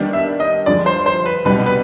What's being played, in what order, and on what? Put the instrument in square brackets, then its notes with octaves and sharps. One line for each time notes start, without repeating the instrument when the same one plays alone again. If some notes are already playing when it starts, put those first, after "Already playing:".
Already playing: [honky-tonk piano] D#3 G3 B3 D4 G4
[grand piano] E5
D#5
[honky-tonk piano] G2 D3 F3 G#3 [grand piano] D5
[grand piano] C5
C5
B4
[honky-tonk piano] C2 B2 G3 B3 D#4 [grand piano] B4
[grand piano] B4